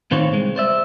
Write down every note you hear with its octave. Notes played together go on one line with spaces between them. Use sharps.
A2 D#3 C4 F4 C#5
C2 G#3 C4
C5 D5 E5